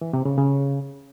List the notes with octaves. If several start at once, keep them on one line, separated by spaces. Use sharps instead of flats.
E3
C3
C#3
C#3